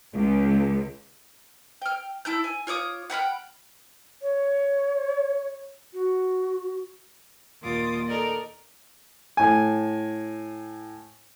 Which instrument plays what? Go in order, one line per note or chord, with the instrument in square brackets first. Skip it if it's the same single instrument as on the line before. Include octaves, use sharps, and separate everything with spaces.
[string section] C#2
[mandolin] G5 F6
E4 A4 G6
G#5
F4 C#5 D6 D#6
F#5 G5 B5 F6
[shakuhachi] C#5
F#4
[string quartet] D#2 A#2 F4 D6 D#6 A6
D#4 A4 A#4 D5 D#5
[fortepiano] A2 G#5